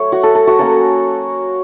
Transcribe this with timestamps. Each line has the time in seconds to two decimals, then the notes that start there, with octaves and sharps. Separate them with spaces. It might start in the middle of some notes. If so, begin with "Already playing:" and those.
Already playing: F#3 A3 C#5
0.12 F#4
0.23 A4
0.35 A4
0.47 F#4
0.59 F#3 A#3 C#4 A4